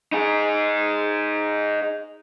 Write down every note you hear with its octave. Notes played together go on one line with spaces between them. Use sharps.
D#4 G#4